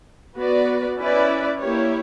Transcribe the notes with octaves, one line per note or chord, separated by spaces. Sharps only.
B3 F#4 B4 D5
C#4 E4 B4 D5
A#3 E4 G4 C#5